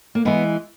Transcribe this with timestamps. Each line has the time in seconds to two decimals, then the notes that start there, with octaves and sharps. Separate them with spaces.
0.15 A#3
0.25 E3 G#3 B3